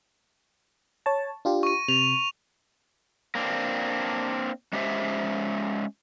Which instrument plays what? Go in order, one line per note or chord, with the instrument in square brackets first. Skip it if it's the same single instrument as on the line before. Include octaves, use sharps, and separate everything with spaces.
[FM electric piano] C#5 A5
D4 F4 G4
[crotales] C#6 D#7
[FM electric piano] C3 [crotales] F7
[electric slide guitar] A#3 C4 D4
G#3 C#4 G4 C5 E5